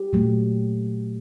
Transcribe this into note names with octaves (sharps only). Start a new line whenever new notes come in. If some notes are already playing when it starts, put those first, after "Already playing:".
Already playing: G4
A#2 F#3 A3